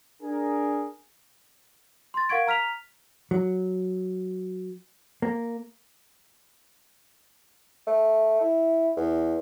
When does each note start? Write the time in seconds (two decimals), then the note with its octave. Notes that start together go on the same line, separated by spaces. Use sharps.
0.22 D4 G#4 A#4
2.14 C6 A6
2.29 A#4 F5 F#5 C#6 G#6 D7
2.47 A#5 F6 B6 F7
3.31 F#3
5.22 A#3
7.87 A3
8.41 E4
8.97 E2